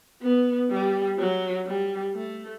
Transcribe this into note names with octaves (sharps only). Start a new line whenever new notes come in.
B3
G3
F#3
G3
A3